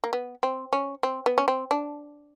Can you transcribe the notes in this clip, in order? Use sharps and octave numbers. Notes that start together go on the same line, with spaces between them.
A#3
B3
C4
C#4
C4
B3
C#4
C4
D4